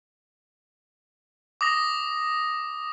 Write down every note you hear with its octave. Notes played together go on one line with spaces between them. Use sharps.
D6 D#6 A#6